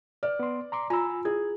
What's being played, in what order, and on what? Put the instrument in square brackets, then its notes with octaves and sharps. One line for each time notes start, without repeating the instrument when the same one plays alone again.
[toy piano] B4 [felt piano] D5
[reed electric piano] B3 C6
A#5 C6 D6
[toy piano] F4 [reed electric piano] G#5 B5 E6 [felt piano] A#5
[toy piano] E4 [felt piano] G#4 [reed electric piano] G#6